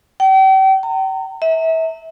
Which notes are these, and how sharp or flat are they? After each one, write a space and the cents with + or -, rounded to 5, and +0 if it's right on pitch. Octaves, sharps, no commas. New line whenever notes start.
G5 -40
A#5 -40
E5 -30